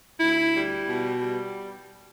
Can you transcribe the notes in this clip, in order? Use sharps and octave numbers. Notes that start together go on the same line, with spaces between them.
D2 E4
G3
B2
G3